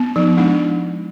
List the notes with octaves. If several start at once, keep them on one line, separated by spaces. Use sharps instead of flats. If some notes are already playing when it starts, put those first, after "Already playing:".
Already playing: B3
F3 D#4
G#3 D4 E4